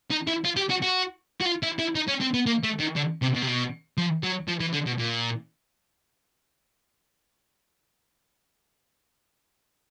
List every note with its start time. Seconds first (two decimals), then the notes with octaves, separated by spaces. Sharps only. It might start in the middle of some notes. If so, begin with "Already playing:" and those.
0.11 D#4
0.27 E4
0.45 F4
0.57 G4
0.70 F#4
0.82 F#4
1.41 F#4
1.45 F4
1.63 E4
1.79 E4
1.95 D#4
2.08 C#4
2.21 C4
2.34 B3
2.46 A#3
2.63 A3
2.80 D#3
2.96 D3
3.22 C3
3.35 B2
3.42 C3
3.47 B2
3.98 F3
4.23 F#3
4.48 F3
4.61 E3
4.73 D3
4.87 B2
4.99 A#2